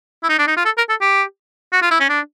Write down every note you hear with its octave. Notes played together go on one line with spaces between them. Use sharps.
E4
D#4
D4
D#4
F4
A4
A#4
A4
G4
F#4
F4
E4
C#4
D4